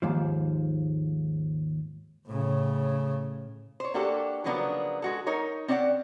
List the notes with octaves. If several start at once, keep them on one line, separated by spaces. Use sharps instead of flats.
D#2 G#2 F3
A2 C#3
C5 C#5
A#3 D4 F#4 G4 A4
C#3 F3 F#3 A#3 B3 D4
G#3 F#4 A4
D#4 A#4 C#5
C4 C#4 D5 E5 F#5